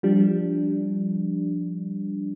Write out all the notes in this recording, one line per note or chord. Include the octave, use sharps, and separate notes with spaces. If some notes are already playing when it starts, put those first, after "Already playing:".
F3 G3 D4